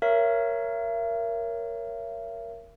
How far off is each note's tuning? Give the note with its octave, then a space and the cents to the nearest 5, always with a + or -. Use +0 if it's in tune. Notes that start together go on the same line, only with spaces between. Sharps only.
A#4 +0 C#5 +0 E5 +45